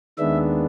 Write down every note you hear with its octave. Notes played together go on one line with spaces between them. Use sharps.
D#2 D#3 G#3 B3 D4 E5